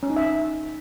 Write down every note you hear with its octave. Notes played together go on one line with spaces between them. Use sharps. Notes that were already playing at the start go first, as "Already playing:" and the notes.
C#4
D#4
E5